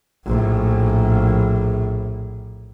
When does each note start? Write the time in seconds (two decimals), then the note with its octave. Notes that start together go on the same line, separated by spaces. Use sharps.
0.25 A#1 A2